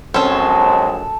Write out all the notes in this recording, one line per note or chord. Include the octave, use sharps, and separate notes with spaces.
A#1 F#3 G#3 C4 C#4 A4